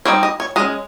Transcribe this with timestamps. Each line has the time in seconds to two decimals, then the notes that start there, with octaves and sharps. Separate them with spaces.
0.05 G3 C4 D#4 C#5
0.23 D#5
0.40 C#5
0.56 G#3 C#4 D#5